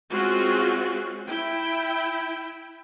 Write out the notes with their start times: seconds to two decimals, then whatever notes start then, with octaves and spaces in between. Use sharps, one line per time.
0.12 G#3 C4 C#4 F4 F#4
1.27 E4 G5